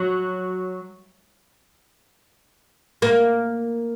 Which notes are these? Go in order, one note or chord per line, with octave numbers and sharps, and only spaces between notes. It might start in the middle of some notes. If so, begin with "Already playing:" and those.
Already playing: F#3
A#3